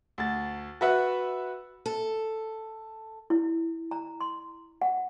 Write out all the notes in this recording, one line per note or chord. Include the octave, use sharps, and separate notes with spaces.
D2 A6
F#4 B4 E5 F#5
A4
E4
A#5
C6
F#5